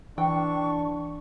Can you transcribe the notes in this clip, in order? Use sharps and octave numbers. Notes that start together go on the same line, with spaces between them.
E3 D4 G5 C#6